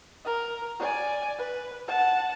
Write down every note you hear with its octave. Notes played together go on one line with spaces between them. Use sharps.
A#4
D5 G#5
B4
F#5 A5